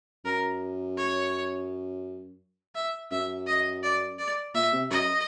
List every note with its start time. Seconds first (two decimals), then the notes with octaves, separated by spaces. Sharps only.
0.25 F#2 A#4
0.97 C#5
2.75 E5
3.11 F#2 E5
3.47 D#5
3.83 D5
4.19 D5
4.54 A#2 E5
4.72 C3
4.90 F#2 D#5